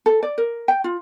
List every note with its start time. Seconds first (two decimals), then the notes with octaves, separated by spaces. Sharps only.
0.06 A4
0.23 D5
0.38 A#4
0.68 G5
0.84 F4